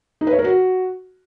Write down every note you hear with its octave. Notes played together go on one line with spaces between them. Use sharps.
D#4
B4
C#5
A#4
F#4